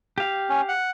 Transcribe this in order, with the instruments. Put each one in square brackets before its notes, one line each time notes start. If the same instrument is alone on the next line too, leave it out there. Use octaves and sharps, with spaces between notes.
[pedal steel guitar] G4 F5
[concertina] C#4
F#5